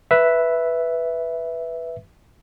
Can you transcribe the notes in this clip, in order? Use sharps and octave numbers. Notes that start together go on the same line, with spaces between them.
B4 E5